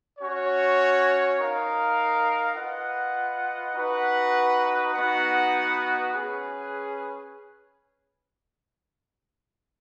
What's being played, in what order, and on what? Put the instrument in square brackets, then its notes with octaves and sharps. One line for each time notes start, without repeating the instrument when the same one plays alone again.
[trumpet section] C#4 F#4 C#5
D#4 A#4 F5
F4 B4 D#5 F#5
D#4 F#4 B4 F#5
B3 D#4 F#4 B4 F#5
C#4 G#4 B4